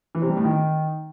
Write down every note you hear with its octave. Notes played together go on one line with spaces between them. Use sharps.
E3
C3
G3
A2
D#3